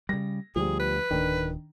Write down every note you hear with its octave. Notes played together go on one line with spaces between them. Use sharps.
C#3 G3 A#6
D2 F3 G3 G#4
B4
D1 D#3 D4